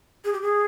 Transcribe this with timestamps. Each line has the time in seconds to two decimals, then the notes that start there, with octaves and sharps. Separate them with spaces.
0.25 G#4
0.33 G4
0.42 G#4